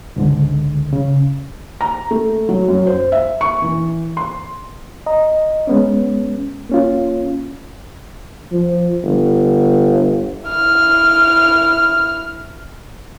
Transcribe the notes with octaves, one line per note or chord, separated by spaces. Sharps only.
C#2 G#2 D3
C#3
A#5
A3
F#3
F#2
C5
E5
C#6
E3
C6
D#5 A#5
G#3 B3 C#4
A#3 C#4 F4
F3
G1
E4 F6